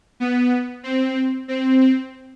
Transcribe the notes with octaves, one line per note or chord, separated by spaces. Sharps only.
B3
C4
C4
C4